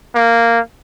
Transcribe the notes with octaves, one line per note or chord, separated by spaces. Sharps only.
A#3